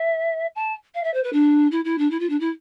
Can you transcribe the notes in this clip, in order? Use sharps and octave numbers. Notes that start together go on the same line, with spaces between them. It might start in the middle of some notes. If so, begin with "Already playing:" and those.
Already playing: E5
A5
F5
E5
C5
B4
D4
E4
E4
D4
E4
F4
D4
E4